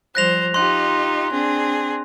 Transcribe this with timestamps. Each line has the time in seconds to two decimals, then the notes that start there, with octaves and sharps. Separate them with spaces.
0.15 F3 G3 C5 F#6 A#6 F7
0.54 D#4 F4 G4 C6 F#6
1.31 C4 D4 G#4